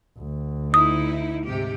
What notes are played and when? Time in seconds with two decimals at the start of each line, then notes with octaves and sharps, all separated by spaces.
0.18 D2
0.74 D#4 E4 D#6
1.45 G#2 C3 G4